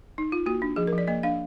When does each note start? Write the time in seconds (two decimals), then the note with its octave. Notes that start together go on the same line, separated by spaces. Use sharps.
0.18 D#4
0.32 F4
0.46 A#3 F#4
0.62 D4
0.76 F3 G#4
0.87 A#4
0.92 F3
0.98 D5
1.07 A#3 D#5
1.23 D4 F5